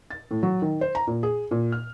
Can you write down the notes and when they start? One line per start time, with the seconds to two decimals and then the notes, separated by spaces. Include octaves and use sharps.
0.10 A6
0.31 A2
0.43 F#3
0.62 D#3
0.81 C5
0.95 A#5
1.07 A#2
1.23 G#4
1.51 A#2
1.72 F6